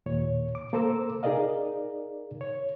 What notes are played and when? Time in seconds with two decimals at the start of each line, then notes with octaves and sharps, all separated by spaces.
0.06 D#2 A#2 C#5
0.55 D6
0.73 A#3 A4 C5 A#5 D6 E6
1.23 D#4 G#4 A#4 D5 D#5 F5
2.41 C#5